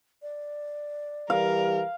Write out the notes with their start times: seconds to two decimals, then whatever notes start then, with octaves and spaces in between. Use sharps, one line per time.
0.22 D5
1.30 E3 G3 G4 A#4 F5